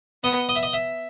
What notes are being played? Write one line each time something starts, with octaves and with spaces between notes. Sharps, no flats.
B3 D#5
D#5
E5
D#5
E5